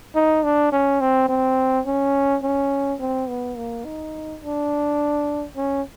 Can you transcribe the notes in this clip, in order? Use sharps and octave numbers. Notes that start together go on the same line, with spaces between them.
D#4
D4
C#4
C4
C4
C#4
C#4
C4
B3
A#3
D#4
D4
C#4